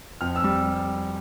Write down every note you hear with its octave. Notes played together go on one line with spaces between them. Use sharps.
F2 F6
E6
G3